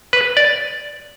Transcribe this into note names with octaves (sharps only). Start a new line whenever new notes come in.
B4
D5